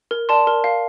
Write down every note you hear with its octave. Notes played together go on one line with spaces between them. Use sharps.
A#4
D5 A5 C6
A#4
F5